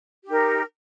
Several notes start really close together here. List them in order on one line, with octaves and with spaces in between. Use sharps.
G4 D#4 A#4